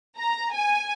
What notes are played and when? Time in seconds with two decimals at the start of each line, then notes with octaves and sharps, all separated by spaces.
0.18 A#5
0.53 G#5